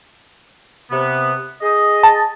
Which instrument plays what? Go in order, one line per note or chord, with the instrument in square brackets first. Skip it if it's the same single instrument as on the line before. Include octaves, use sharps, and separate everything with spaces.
[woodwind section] C3 B3
G#4 D#5
[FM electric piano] A5